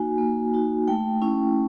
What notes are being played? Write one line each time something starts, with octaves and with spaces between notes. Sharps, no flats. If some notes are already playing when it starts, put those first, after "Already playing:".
Already playing: A#3 D#4 F#4 G#5
A#3
D#4 F#4
A3 G5
C#4 E4